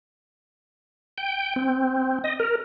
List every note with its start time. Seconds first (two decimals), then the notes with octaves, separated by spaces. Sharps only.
1.18 G5
1.56 C4
2.24 D#5
2.40 A#4